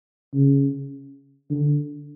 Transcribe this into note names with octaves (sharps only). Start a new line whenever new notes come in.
C#3
D3